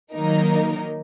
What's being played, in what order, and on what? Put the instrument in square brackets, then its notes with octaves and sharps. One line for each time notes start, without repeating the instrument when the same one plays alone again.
[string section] D#3 F#3 A#3 D#4 A#4